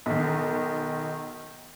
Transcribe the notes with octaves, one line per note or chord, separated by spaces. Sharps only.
B1 D#3